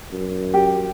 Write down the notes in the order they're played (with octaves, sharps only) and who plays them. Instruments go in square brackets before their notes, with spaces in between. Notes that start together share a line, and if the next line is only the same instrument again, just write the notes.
[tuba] F#2
[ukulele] G4